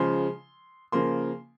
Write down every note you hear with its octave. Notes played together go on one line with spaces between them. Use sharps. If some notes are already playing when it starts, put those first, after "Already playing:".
Already playing: C#3 F3 G#3 C6
C#3 F3 A#3 C6